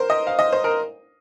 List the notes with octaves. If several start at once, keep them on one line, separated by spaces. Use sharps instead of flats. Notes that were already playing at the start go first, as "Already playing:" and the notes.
Already playing: A#4 C5
D#5
F5
D#5
C5
A#4